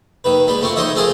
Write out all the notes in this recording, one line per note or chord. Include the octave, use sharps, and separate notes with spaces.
D#2 D#3 B4
G3 G#3 B4
A3 A#3 C4 F4 C#6
D#4 C5 C#5 D#5 E5
A3 C4 F4 G#4 A#4 C5